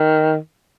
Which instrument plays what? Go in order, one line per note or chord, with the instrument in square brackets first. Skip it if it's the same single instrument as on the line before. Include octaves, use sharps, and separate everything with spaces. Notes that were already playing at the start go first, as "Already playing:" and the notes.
Already playing: [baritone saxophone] D#3